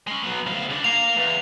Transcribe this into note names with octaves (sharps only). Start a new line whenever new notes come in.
G#3 C#4
F#3 B3
D2 F5
C#3 D4
A#3 F5 F7
E2